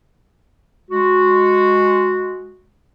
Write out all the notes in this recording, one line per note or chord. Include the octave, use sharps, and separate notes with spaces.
G#3 F#4